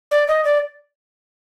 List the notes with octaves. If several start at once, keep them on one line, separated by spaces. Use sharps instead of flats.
D5
D#5
D5